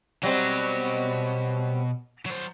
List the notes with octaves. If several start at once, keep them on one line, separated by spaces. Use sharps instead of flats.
B2 F#3 G3 C4 D#5
F#3 C5